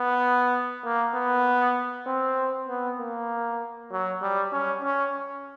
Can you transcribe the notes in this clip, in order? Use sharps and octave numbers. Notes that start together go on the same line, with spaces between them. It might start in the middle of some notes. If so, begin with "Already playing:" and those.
Already playing: B3
A#3
B3
C4
B3
A#3
F#3
G3
C#4
C#4